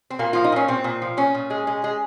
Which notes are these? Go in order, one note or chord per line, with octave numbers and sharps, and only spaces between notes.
C4
A#2 A#3
F3 F4
D#4
A#2 C#4
A#2 C4
A#2
F3
A#2 C#4
A#2
G#3
G#3
G#3